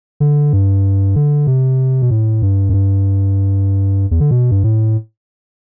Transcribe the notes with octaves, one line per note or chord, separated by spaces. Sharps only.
D3
G2
D3
C3
B2
A2
G2
F#2
G2
E2
D3
B2
G2
A2